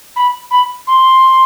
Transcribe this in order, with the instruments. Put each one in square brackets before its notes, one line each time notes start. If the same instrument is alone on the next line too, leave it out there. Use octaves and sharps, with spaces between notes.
[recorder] B5
B5
C6